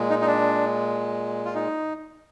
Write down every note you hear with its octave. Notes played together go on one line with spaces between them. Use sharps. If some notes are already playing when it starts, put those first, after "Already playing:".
Already playing: A#2 G#3
D#4
D#4
D4
F4
D#4